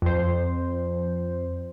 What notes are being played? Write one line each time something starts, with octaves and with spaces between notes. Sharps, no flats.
F2 C5